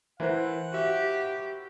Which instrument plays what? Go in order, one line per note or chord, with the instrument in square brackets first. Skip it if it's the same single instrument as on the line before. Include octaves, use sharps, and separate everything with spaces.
[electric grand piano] E3 [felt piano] E4 A#4 C5 [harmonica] F#5
[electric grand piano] F#4 E5 [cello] G4